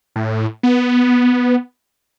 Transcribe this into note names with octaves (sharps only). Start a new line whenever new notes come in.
A2
B3